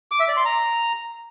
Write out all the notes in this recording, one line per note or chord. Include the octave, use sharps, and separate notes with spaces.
D6
E5
D5
C6
A#5